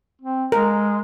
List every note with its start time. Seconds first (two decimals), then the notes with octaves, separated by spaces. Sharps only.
0.22 C4
0.52 G#3 A#4